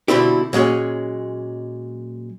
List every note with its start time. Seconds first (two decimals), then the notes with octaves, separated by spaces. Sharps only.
0.08 B2 D3 G3 C4 E4 G4
0.53 A#2 F#3 G#3 C#4